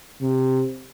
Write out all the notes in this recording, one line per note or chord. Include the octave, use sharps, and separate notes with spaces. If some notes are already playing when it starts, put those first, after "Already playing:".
C3